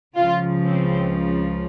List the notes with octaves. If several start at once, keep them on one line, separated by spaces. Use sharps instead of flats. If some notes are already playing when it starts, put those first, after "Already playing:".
C#2 C#3 F3 F4
C4